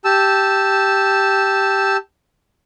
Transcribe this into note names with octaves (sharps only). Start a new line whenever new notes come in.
G4 A5 E6